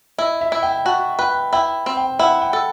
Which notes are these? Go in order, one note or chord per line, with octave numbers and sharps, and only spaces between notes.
E4 D#5
E5
E4
G5
F#4 A5
B4 G5
E4 G5
C4
G5
E4 F#5
G5
A4